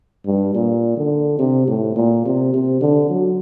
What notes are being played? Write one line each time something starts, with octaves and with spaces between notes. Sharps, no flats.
G2
A#2
D3
C3
A2
A#2
C3
C3
D3
F#3